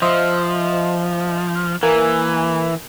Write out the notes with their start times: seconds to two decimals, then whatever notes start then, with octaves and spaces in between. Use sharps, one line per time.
0.02 F3 C5 D#5 E5
1.83 E3 A#3 A#4 G#5